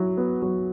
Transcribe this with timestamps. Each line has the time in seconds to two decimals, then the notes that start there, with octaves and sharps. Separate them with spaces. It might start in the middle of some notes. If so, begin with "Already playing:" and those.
Already playing: F#3 E4
0.17 B3
0.42 F#3